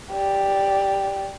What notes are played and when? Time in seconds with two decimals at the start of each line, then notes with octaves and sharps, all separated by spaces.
0.12 G4 D5